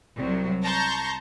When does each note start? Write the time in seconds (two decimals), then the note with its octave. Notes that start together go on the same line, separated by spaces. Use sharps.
0.17 C2 F#3
0.64 A5 A#5 C6 C#6 G6 A#6